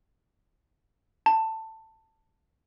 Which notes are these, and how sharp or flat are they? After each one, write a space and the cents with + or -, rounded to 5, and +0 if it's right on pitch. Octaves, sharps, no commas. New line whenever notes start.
A5 +15